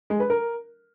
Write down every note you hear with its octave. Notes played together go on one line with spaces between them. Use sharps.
G#3
B4
A#4